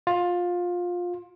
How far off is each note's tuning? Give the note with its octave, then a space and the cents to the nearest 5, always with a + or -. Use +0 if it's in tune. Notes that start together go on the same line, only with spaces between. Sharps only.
F4 +20